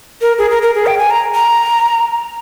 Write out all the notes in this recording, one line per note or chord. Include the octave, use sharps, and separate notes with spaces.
A#4
G#4
A#4
A#4
G#4
G5
G#5
A#5
A#5